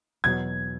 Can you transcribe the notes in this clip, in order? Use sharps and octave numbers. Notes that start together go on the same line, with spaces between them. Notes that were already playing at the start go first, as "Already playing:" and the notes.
E2 B2 F#3 G#6